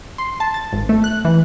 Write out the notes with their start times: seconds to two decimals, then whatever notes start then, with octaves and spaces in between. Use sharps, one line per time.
0.18 C6
0.40 A5
0.54 A6
0.72 G#1
0.89 A3
1.04 F#6
1.25 E3